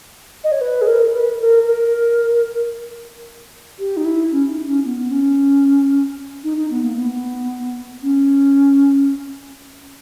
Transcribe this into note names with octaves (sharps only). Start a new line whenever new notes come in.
D#5
C#5
B4
G#4
A#4
B4
A#4
A#4
G4
D#4
E4
C#4
D#4
C#4
B3
B3
C#4
D#4
D#4
B3
A#3
B3
C#4